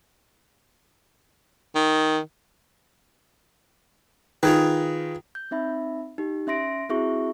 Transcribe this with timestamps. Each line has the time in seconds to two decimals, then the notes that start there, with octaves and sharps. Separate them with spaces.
1.76 D#3
4.43 D#3 F4 G#4 B4
5.35 G6
5.51 C4 D#4 E5 B5
6.18 D#4 G4
6.47 C#4 E5 C6 A#6 D7
6.89 C4 E4 F#4 G#4 E5 C#6